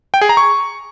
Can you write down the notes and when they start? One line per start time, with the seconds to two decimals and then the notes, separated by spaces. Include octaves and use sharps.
0.14 G5
0.21 G#4
0.29 A#5
0.37 C#6